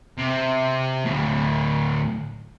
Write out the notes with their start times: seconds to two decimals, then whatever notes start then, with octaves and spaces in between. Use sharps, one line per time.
0.17 C3
1.05 D2 A2